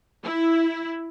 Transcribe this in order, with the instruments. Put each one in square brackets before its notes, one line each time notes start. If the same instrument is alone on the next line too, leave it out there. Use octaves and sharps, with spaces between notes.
[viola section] E4